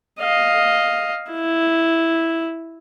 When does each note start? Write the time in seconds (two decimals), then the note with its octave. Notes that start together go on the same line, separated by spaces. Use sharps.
0.20 D#5 F5
1.31 E4